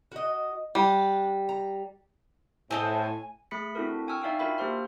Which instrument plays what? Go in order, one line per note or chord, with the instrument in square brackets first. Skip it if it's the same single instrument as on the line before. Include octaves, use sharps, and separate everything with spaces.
[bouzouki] F#4 D#5
[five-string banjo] G3 [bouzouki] D4
[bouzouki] A#5
[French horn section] A2 [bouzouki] C4 A4 D#5 [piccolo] G#5
[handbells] A3 G#4 B5 B6 C#7
C4 D4 E4 F#4 A4 A#4
G5 G#5 C#6 E6 F6
D#4 D5 E5 F5 G5 G#5
D4 F4 F#4 A#4 E5 B5
A#3 G4 C5 C6 F6